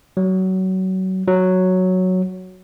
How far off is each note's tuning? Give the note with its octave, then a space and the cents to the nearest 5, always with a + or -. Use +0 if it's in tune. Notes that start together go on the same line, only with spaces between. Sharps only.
F#3 +25
F#3 +0